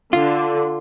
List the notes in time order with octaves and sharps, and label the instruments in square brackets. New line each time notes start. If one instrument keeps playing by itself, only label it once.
[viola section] D3 [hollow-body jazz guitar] F4